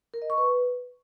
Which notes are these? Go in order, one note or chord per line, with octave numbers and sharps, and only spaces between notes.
A#4
D#5
C#6
B4